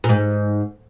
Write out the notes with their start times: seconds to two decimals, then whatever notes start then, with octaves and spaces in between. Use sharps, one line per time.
0.04 A#2
0.09 G#2